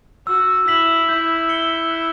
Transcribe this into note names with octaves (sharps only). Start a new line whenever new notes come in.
F#4 E6
E4 B6 F#7
E4 G6
C#7 G7
F#6